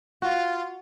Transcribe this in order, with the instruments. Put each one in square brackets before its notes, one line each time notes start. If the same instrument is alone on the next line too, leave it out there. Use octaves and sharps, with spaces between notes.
[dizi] F4 [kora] F#4